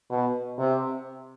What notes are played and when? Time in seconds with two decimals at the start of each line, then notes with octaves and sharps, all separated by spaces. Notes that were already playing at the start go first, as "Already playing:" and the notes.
0.10 B2
0.59 C3